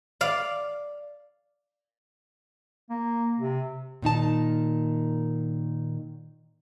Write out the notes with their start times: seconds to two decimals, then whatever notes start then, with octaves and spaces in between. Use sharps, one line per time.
0.21 D5 F5
2.90 A#3
3.39 C3
4.02 A#2 D#3 D#4 A5